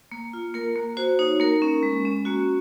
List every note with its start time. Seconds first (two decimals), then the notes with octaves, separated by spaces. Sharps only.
0.12 A#3
0.33 F4
0.54 A#3 A#4
0.76 A#3
0.97 F#4 C5
1.19 D#4 C#5
1.40 A#3 A#4
1.62 C#4
1.83 G#3
2.05 C#4
2.25 A#3 F#4